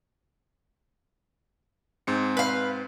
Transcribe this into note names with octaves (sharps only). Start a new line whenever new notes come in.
G#2 C4 C#7
B4 F5